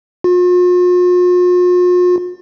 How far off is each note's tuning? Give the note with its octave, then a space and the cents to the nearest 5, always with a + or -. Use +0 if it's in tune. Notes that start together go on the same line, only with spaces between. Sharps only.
F4 +45